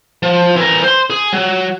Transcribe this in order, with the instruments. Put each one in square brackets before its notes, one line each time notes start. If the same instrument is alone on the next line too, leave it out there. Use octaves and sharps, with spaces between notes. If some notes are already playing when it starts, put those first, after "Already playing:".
[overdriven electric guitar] F3
E3 A#4
C5 C6
G#4
F#3